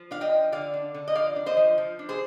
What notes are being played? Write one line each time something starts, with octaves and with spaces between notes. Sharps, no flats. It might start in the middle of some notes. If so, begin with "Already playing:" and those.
Already playing: F3
D4 F5
D#5 G5
F3
D3 D5 F5
D4
D3
D#5
F3 D5 F5
D4
C5 D#5
F3
F3
D4
G#4 C5